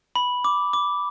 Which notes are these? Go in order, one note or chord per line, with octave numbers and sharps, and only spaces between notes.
B5
D6
D6